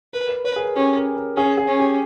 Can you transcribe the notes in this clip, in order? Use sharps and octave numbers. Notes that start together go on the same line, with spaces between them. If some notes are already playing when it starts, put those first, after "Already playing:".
A#4 B4
B4
B4 C#5
G#4
A#4
C#4 G4
A#4
A#4
C#4 G#4
G#4
C#4
G4